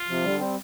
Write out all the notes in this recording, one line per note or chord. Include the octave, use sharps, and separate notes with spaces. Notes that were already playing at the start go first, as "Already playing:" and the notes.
Already playing: F4
C3 F3
D3 G3
G3 C4